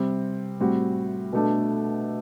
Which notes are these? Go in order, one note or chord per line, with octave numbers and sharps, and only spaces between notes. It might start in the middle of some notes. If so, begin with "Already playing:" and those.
Already playing: C3 G3 C4
A2 G3 C4 F#4
B2 A3 D4 A4